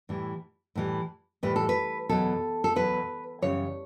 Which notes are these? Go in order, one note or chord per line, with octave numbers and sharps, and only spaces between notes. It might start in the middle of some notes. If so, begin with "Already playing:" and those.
A2 E3 G3
A2 E3 G3
A2 E3 G3 B4
A4
B4
E2 B2 F#3 A4
A4
E2 B2 F#3 B4
F#2 C#3 E3 G3 C#5